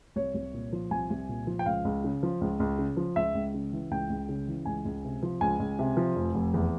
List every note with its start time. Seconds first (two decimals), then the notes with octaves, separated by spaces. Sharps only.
0.16 C2 C#5
0.35 C2
0.54 A#2
0.73 F3
0.91 C2 G#5
1.10 C2
1.29 A#2
1.47 F3
1.59 G5
1.66 C#2 F5
1.85 C#2
2.04 C#3
2.23 F3
2.41 C#2
2.60 C#2
2.78 C#3
2.97 F3
3.16 C#2 E5
3.35 C#2
3.54 C#3
3.72 E3
3.91 C#2 G5
4.10 C#2
4.29 C#3
4.48 E3
4.66 C#2 G#5
4.85 C#2
5.04 C3
5.23 F3
5.41 C#2 G#5
5.59 C#2
5.79 C3
5.97 F3
6.16 F1
6.35 F1
6.54 E2